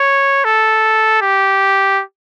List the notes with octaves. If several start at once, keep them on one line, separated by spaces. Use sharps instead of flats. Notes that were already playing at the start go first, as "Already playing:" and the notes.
Already playing: C#5
A4
G4